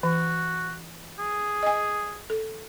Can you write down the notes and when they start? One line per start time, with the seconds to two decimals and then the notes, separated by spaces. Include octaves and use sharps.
0.03 E3 F#4
1.19 G#4
1.63 D#5 G#5
2.30 A4